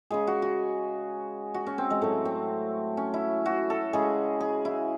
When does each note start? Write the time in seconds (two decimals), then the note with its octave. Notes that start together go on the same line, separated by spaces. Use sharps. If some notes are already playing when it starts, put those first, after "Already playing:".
0.10 C#3 G#3 G#4
0.27 F#4
0.42 F#4
1.54 F#4
1.67 C#4
1.78 C4
1.90 G#3
2.01 A2 F#3 A3
2.25 C4
2.97 C#4
3.14 E4
3.46 F#4
3.70 A4
3.93 C#3 G#3 G#4
4.41 G#4
4.65 E4